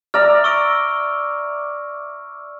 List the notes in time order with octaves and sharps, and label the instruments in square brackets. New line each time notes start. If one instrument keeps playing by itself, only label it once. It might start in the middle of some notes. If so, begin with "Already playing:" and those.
[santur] D5 E5 A#5 [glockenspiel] F6
[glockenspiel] C#6 E6 D7